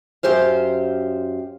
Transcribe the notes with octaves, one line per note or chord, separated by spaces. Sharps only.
F#2 G4 C5 F5